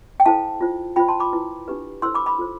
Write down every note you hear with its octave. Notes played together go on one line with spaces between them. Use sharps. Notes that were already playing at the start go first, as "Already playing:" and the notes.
G5
E4 A4 C5 F5 A5
F4 C5
F4 C5 G5 B5
A5 C6
B5 D6
E4 B4
D4 G4 B4
E4 A4 C5 C6 E6
B5 D6
B5 D6
F4 A4 C5